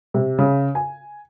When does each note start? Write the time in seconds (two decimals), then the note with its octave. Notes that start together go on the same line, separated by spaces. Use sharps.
0.14 C3
0.38 C#3
0.75 G#5